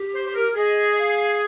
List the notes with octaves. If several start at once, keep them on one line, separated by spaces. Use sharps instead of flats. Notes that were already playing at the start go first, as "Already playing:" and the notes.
Already playing: G4
C5
C5
A#4
G#4 D#5
F5